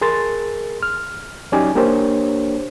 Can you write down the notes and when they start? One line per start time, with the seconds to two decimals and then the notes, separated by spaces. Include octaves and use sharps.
0.01 G#4 A#4 C6 A6
0.83 F6
1.52 F#3 C#4 D#4 G4 D5 G#5
1.75 A#3 D4 G4 A#4 C5 C#5